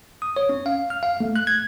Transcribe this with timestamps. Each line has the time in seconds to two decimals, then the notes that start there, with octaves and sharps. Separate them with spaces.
0.22 D#6
0.36 C#5
0.49 C#4
0.66 F5
0.90 F6
1.03 F5
1.21 A3
1.36 F#6
1.47 G#6